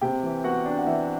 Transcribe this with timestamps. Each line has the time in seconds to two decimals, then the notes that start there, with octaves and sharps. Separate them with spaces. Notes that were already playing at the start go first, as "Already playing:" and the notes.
0.01 C3 G4 G5
0.23 E3
0.44 B3 F#4 F#5
0.65 D4
0.79 F#5
0.86 E3 E4 E5